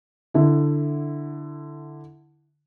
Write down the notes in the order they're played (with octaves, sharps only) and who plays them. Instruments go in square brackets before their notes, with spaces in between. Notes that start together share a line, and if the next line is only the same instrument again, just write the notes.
[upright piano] D3 E4